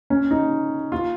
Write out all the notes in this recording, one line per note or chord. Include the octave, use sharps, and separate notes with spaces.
C#4
D#4
F4